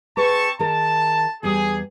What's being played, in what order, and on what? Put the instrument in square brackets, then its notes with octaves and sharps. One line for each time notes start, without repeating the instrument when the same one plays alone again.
[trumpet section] C4 A5 C#6 [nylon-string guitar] G#4 B4
[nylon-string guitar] D#3 G#4 A#4 [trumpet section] A5
[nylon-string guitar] E2 G3 G4 [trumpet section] G#4